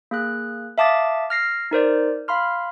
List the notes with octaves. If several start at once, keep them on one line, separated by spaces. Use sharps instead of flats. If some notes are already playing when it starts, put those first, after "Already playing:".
A#3 G#4 F#6
E5 F5 A5 D6 D#6 A6
F6 A#6 C7
D#4 A#4 C5 D5
F5 B5 C6 F6